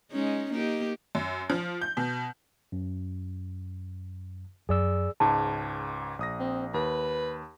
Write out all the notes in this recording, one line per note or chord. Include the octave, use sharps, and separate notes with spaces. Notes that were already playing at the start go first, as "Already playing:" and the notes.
G#3 C#4 D#4
A#3 D#4 G4
F#2
F3
G6
B2
F#2
F#2 G#4 D5 E6
C#2 G#2 A5
A#1 D#6 A#6
C4
D#2 B4